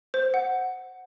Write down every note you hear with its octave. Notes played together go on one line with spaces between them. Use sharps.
C5
F#5